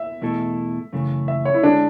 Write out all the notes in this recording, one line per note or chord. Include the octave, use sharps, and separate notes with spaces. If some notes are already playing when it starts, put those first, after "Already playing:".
Already playing: E5
E2 B2 A3 E4 A4
F#2 C#3 E3 A3
E5
C#5
E4
D2 D3 G#3 C#4 D4